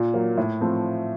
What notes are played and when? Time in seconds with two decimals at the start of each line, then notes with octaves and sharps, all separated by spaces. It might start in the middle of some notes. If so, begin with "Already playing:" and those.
Already playing: A#2
0.14 F#3 A#3
0.37 A2
0.61 F3 A3 C4